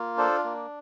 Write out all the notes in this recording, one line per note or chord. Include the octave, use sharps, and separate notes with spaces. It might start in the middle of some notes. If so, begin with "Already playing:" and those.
Already playing: A#3 F4
D4 A4 C5
A#3